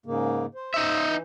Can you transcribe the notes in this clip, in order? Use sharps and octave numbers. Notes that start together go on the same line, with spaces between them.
G#2 C#3 A#3
C5
D#4 E5
E3